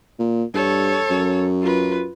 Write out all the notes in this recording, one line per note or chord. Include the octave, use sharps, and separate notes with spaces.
A#2
G2 A4 C#5
F#2
F4 B4